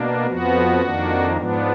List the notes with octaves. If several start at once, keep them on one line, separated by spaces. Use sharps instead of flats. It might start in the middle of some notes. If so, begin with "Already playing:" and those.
Already playing: B2 A#3 D4
F2 F3 B3 F#4
F2 D#3 A#3 D4
G#2 F3 B3 D4